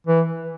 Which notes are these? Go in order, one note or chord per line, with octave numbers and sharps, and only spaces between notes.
E3